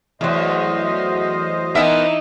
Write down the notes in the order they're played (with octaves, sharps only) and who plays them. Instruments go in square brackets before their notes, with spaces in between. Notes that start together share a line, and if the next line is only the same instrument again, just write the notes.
[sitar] E2 [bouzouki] F#3 A3 [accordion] C5 D#5
[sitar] E3 E5 [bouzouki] B3 E4 A#4 [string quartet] D#4